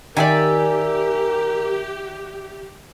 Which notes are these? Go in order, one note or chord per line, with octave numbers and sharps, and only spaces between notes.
D#3 G4 A#4 D5 E5 G#5